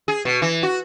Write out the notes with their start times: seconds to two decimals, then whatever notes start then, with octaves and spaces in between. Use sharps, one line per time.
0.08 G#4
0.25 B2
0.42 E3
0.63 F#4